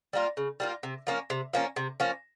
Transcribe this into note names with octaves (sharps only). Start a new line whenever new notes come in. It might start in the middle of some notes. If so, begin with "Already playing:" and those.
G3 A#3 F4
C#3
G3 A#3 F4
C3
F3 A#3 C#4
C3
F3 A#3 C#4
C3
F3 A#3 C#4